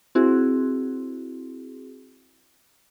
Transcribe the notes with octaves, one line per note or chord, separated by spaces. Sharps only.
C4 E4 F#4 G#4